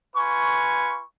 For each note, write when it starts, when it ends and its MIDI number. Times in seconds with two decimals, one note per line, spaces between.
0.15 1.00 65
0.15 1.00 71
0.15 1.00 80
0.15 1.00 85